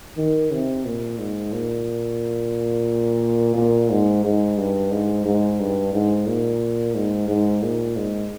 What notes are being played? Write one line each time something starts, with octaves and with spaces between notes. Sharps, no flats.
D#3
C3
A#2
G#2
A#2
A#2
G#2
G#2
G2
G#2
G#2
G2
G#2
A#2
G#2
G#2
A#2
G#2